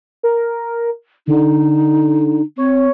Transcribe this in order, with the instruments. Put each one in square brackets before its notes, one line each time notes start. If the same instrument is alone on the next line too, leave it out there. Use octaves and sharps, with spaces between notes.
[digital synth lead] A#4
[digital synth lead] D3 [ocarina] D#4
[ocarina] C4 [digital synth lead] C#5